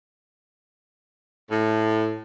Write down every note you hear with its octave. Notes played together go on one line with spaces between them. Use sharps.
A2